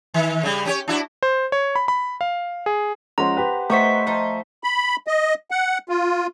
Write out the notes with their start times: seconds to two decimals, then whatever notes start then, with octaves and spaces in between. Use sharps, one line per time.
0.14 D#3
0.43 C#3 G3
0.65 C#4 G4 C#5
0.88 D4 E4 F#4
1.23 C5
1.52 C#5
1.76 B5
1.88 B5
2.21 F5
2.66 G#4
3.18 F3 G#3 C#4 C5 F#5 A#5
3.37 G4 B4
3.70 A3 B3 D#4 C5 F#5 C#6 E6 B6
4.07 F3 D#4 C5
4.64 B5
5.07 D#5
5.51 F#5
5.89 F4